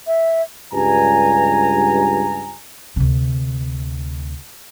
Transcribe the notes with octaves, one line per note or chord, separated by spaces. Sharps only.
E5
C#2 G2 G#5 A#5
D2 C3